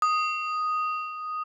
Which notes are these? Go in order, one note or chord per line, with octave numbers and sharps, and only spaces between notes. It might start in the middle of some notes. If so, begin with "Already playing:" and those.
D#6